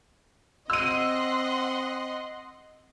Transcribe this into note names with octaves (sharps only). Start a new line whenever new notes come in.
C4 D#5 F#5 C6 E6 D#7